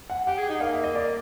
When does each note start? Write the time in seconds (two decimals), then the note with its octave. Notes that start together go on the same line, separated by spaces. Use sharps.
0.10 F#5
0.27 G4 F#5
0.38 G#4
0.49 D#4
0.61 A#3 F5
0.73 E5
0.84 D#5
0.95 D5